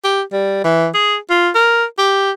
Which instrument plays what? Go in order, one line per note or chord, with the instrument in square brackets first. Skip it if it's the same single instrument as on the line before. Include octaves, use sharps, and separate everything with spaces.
[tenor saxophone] G4
G3
E3
G#4
F4
A#4
G4